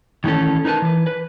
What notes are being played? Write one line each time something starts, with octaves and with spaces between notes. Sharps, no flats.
D#3 E3 A3 C#4 A4
D#4 A#4 B4 A5
E3 B4
B4